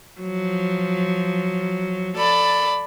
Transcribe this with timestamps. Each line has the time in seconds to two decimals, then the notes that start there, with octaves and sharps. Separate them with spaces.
0.20 F3 F#3
2.17 A4 D5 B5